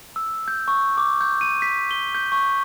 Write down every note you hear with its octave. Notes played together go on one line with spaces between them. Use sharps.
E6
G6
C#6
D6
G6
D#7
B6
G7
G6
C#6